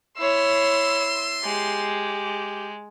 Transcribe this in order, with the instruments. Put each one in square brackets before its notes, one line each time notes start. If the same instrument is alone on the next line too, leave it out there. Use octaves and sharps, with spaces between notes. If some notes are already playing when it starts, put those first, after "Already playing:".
[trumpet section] B3 C6 [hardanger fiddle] E4 C#5 [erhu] E6
[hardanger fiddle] G#3 [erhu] G4